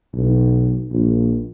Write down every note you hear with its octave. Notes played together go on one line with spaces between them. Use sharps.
B1
A#1